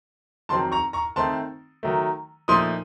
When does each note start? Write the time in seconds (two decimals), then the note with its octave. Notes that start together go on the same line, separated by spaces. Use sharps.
0.49 F2 D#3 F#3 C4 D#4 A5 C6
0.72 A#5 C#6
0.93 A#5 C#6
1.16 D#3 A3 C4 D#4 A5 C6
1.83 D#3 F#3 A3
2.48 A#2 F3 A3 D#4 C6 D#6